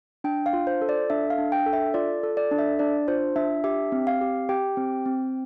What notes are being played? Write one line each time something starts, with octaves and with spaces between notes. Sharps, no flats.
D4 G5
F5
F4
C5
A4
D5
D4 E5
F5
D4
G5
A4
E5
F4 D5
A4
D5
D4
E5
D4 D5
F4 C5
D4 E5
G4 E5
C4
F5
G4
G4 G5
C4
C4